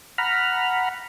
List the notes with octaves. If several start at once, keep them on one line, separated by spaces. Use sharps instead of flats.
F#5 A#5 B5 F6